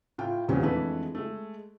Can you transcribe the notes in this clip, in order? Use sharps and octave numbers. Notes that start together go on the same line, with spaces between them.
A2 F4 G5
E2 A#2 G3 C4 C#4
F2 D3 E3 G#3 A3 B4
G#3 A3